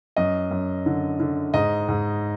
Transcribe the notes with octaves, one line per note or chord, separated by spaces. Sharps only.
F#2 D#5
F#2
D3
D3
G#2 D#5
G#2